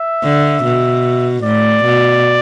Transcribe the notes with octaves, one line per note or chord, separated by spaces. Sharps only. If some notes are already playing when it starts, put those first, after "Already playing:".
Already playing: E5
D3
B2
A2 D5
B2